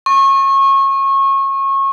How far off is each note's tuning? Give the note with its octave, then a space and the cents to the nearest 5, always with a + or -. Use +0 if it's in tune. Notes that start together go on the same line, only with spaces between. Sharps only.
C#6 -25